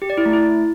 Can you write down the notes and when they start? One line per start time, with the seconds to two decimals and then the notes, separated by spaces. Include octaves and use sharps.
0.02 G4
0.10 D5
0.18 E4
0.25 A3
0.33 E4